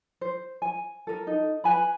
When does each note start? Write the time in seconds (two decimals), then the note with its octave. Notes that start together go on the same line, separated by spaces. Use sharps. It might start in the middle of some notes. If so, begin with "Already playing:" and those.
0.21 C5
0.62 G#5
1.07 A4 A#4
1.27 D#4 A4
1.64 B4 G#5 B5